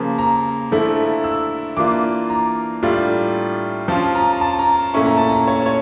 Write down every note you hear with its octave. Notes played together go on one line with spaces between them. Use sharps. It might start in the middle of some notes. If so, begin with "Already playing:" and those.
Already playing: C#3 F3 A#3
A#5
D3 F3 A3 E4
E6
E3 A#3 D4 F4 D6
A#5
A2 G3 D4 F4
F3 C#4 F4 A5
A#5
A#5
A5
A#5
A#2 A3 C#4 E4 C#6
A#5
A5
A#5
C#5
C#5